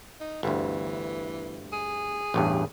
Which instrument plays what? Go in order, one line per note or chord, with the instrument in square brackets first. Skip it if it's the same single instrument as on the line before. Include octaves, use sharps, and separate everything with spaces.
[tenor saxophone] D#4
[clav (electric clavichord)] G1 D2 [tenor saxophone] E3
[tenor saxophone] G#4
[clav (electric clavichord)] A1 E2 G2